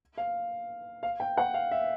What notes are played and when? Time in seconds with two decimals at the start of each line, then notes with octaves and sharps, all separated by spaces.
0.18 F5
1.03 F5
1.20 G5
1.38 F#5
1.54 F5
1.71 E5